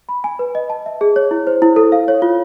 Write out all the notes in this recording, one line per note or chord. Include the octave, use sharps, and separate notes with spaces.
B5
G#5
B4
D#5
A5
E5
G#4
C#5
E4
C5
E4
A4
F5
C#5
F4